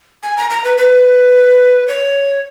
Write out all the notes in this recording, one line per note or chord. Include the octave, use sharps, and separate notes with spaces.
G#5
A#5
A#5
B4
B4
C#5